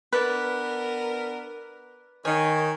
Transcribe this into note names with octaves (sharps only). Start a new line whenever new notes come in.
B3 D4 A#4 B4 D5
D#3 C#5 G#5